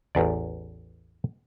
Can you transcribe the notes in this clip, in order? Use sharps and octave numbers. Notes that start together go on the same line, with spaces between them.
A1 E2 D5